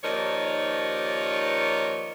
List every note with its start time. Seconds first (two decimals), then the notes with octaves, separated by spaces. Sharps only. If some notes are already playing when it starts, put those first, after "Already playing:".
0.03 D#2 F3 D#4 A#4 C#5 D5